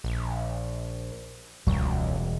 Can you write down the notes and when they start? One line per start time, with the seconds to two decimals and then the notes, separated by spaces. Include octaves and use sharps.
0.04 A#1
1.67 E1 C#2 F#3 G3